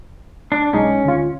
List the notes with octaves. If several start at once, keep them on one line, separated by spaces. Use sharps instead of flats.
D4
B1 G#3 C#4 D#4
D2 F4